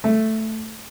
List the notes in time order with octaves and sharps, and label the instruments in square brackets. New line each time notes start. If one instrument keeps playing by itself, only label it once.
[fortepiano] A3